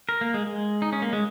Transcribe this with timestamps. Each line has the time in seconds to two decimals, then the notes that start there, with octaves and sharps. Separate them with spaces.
0.09 A#4
0.21 A#3
0.34 G#3
0.47 G#3
0.82 D#4
0.93 C#4
1.02 A#3
1.13 G#3